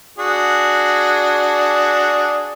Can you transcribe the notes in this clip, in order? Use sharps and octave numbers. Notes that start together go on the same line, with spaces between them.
D4 F#4 G#4